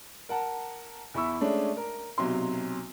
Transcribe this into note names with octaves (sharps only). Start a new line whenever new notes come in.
A#4 F#5 A5 A#5
E2 E4 B5 C#6 E6
G#3 A3 C#4 D4
A#4
B1 C3 F#3 C6